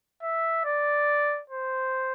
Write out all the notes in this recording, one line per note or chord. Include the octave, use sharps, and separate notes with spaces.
E5
D5
C5